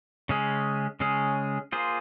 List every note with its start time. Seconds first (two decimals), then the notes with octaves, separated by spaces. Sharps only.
0.29 C#3 G#3 C#4 G#4
1.00 C#3 G#3 C#4 G#4
1.72 A#3 F4 G#4 C5